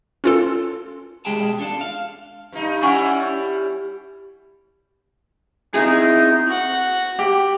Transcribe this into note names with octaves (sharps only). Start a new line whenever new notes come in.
C#4 F4 A4
B2 G#3 G4 G#4 G5 A5
D4 F4 A4
F5
G2 D#4
G3 C#4 E4 F#5 G#5 C#6
C4 D#4 E4 G#4
F#4 F#5
G4